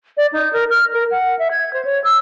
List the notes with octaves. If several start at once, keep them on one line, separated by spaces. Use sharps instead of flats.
D5
D#4
A#4
F6
A#4
F#5
E5
G#6
C5
C#5
E6